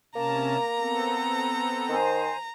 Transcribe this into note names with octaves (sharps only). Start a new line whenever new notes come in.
C3 A#3 C#4 A5 A#5
B3 C4 A4
D#3 C5 G#5